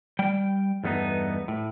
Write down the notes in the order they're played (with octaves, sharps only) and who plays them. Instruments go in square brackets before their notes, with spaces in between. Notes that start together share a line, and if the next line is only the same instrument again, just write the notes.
[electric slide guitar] G3 G5
E2 G2 A3 B3 D#4
A2